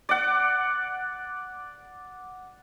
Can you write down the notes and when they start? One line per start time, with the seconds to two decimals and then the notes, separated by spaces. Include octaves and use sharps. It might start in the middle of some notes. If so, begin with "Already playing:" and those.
0.09 D5 F#5